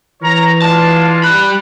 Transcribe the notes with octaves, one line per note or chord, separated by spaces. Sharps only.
E3 A#4 C#5 A#5
G#3 D4 F4 A5
G3 B5 F#6